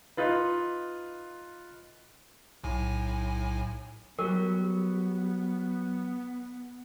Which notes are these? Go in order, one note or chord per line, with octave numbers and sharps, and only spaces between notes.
D#4 F4 B4
B1 A2 G#5
F#3 G3 B3 A#4